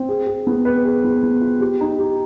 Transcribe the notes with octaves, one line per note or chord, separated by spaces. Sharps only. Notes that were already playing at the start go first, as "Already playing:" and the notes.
Already playing: C4
G#4
G#4
B3
B4
G#4
B3
B3
F4
G4
D#4
G4